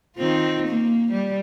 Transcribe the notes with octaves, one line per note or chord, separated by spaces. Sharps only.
D#3 C4 F4
A#3
G3